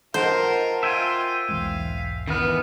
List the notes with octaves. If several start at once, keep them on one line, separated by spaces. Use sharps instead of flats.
F4 A#4 C5 D#5 F#5 A5
F4 E5 G5 G#5
G6
B1 E2 G#2 F5
D#3 E3 B3 F6